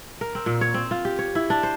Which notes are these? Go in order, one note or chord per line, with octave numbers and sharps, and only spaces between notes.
A#4
C4
A#2
C#5
C4
F4
G4
C#5
E4
D4
C5